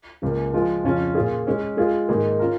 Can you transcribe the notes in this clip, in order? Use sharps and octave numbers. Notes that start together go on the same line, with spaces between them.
C#2 C#3 A#3
F3 G#3 F4
F2 C#3 F3 C#4 F4
A#2 A#3 F4 G#4
G#3 C#4 G#4
G#3 F4 G#4 F5
G#2 D#3 A#3 D#4 G#4
C#4 F4 A#4